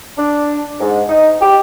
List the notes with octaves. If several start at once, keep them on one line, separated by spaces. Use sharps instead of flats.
D4
G#2
D#4
G4